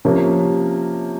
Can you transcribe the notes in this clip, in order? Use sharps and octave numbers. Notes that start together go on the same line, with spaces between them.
C3 F3 A#3 C#4